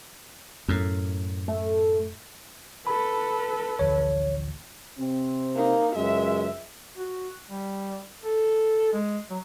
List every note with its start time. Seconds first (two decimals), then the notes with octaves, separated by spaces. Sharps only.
0.68 F#2 A2
1.48 A3
2.87 A4 B4 B5
3.79 A1 D2 F3 C#5
4.98 C3 C4
5.56 A#3 D#4
5.96 C#2 F#2 G#3 E5
6.98 F#4
7.50 G3
8.23 A4
8.93 G#3
9.30 F#3